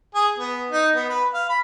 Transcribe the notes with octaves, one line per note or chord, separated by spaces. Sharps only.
G#4
B3
D#4
B3
B4
F5
B5